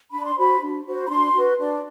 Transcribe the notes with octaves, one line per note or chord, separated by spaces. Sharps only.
D4 B5
C6
F#4 C5 B5
D4
F#4 C5
B5
D4 C6
F#4 B4
D4